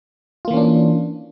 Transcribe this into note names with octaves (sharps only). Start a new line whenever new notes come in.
E3 A#3 C#4 D4 F4